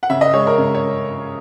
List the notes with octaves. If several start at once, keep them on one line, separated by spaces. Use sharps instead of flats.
F#5
C#3 E5
D#5
G#3 C#5
A#4
C#3
C#5